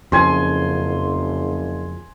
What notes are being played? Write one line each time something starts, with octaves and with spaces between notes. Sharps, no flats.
F#1 F2 C#3 F3 G#5 C6